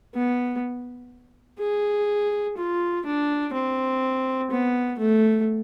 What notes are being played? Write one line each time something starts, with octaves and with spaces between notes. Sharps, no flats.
B3
G#4
F4
D4
C4
B3
A3